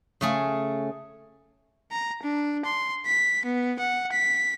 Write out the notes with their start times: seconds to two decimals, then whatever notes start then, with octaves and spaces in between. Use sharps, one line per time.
0.21 C#3 A3 G#4
1.92 A#5
2.23 D4
2.65 C6
3.06 B6
3.45 B3
3.80 F#5
4.12 B6